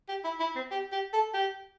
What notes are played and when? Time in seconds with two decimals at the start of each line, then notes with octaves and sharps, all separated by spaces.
0.08 G4
0.24 E4
0.40 E4
0.56 C4
0.71 G4
0.92 G4
1.13 A4
1.34 G4